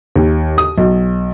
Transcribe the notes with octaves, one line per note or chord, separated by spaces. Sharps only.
D#2
D#6
B1